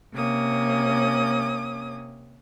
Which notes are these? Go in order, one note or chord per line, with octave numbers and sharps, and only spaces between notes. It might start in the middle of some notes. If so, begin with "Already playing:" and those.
C3 A#3 C#4 D#6